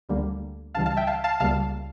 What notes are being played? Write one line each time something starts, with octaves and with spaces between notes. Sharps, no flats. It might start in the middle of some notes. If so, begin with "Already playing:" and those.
D2 D3 G3 A#3
C#2 C#3 E3 G3 F5 A5
F5 A5
E5 G5
F5 A5
F5 A5
C#2 C#3 G3 A#3 F5 A5